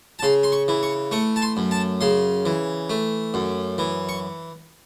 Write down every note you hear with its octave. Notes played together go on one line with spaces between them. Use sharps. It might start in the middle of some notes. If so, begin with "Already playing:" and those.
A5
C#3 C6
C6
C#6
E3
C#6
A3 C#6
A5
C6
F#2
A5
C#3 C6
E3
A3
F#2
E3
C#6